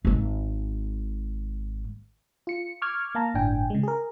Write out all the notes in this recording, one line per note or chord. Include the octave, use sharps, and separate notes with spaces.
G#1 G#2
F4 C#7
C#6 D6 F6 G#6
A#3 F5 A5 A#5
G1 A2 D4 G5 G#5
C#3 G#3
G#4 A#4